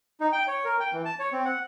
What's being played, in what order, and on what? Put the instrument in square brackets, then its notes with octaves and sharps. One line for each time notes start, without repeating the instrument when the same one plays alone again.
[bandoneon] D#4
G5
C#5
A#4
G5
E3
A5
C#5
C4
F#5